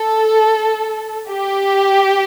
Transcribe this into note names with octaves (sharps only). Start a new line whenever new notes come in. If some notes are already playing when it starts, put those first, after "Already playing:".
Already playing: A4
G4